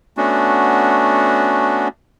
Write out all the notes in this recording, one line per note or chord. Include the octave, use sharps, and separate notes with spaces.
A3 B3 C#4 D4 F#4